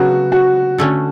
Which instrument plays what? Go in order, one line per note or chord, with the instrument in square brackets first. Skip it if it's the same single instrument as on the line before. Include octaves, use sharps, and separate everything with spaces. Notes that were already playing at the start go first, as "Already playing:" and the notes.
Already playing: [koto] C#3 F#3 B3 [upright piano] F#4
[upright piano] F#4
[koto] D3 A3 C#4